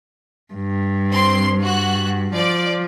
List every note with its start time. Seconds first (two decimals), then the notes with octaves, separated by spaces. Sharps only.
0.54 G2
1.12 C4 C6
1.63 F#4 F#6
2.34 F3 D5